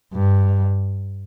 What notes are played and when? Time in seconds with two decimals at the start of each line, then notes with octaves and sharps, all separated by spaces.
0.14 G2